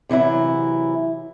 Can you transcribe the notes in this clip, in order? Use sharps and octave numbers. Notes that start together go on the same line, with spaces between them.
C3 E3 F#3 E4